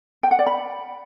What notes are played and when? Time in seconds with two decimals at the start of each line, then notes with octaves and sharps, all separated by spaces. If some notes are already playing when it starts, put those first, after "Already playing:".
0.23 G5
0.31 F#5
0.39 D5
0.47 B5